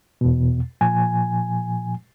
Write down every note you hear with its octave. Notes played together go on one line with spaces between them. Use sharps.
E2 B2
A#2 F3 G#5